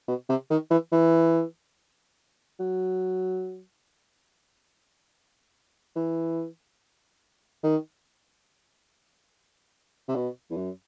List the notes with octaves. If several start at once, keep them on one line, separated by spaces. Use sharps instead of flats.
B2
C3
D#3
E3
E3
F#3
E3
D#3
C3
B2
E2
F#2